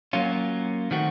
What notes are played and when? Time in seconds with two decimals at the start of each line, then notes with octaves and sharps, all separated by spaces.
0.13 F#3 A#3 C#4 F4
0.91 D#3 A3 C4 F#4